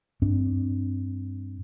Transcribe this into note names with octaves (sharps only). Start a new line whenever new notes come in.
G2 C4 D4